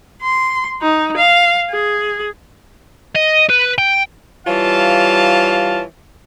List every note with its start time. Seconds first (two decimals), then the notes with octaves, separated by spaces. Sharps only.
0.23 C6
0.82 D#4
1.17 F5
1.71 G#4
3.15 D#5
3.50 B4
3.78 G5
4.47 E3 G3 F4 C#5 F5 A5